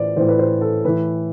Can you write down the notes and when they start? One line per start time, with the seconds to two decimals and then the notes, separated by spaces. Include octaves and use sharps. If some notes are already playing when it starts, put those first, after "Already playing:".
Already playing: A2 E3 C5 D5
0.16 A2 E3 C5
0.28 B4
0.39 C5
0.61 A4
0.85 A2 E3 B4